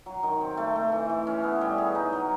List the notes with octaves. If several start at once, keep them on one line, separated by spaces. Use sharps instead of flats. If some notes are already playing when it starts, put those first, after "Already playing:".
F#3
D#3
C4
A3
A3
E3
E3
C#4
B3
G3
G#4
D#4
F#3